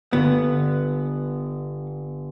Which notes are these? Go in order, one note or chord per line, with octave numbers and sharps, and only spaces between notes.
G1 B3